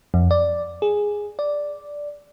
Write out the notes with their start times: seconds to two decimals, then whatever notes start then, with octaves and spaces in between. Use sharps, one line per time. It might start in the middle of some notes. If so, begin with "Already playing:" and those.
0.14 F2
0.31 D5
0.82 G#4
1.39 D5